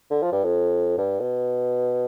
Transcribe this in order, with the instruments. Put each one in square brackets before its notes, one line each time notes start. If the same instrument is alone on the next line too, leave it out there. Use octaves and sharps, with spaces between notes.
[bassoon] D3
F3
G2
F2
G2
B2